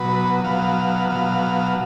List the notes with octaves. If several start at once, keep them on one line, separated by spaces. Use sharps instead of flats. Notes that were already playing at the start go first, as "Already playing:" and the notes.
Already playing: B2 F#3 B4
B2 F#3 F5
B2 F#3 F5